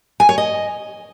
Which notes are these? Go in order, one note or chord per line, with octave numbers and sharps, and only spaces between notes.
G#5
C#5
D#5